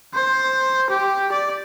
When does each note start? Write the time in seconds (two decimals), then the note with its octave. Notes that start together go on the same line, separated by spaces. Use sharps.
0.15 C5
0.91 G4
1.32 D5